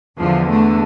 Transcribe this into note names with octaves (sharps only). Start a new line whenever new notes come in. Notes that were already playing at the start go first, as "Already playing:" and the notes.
E2 D3 F3
A3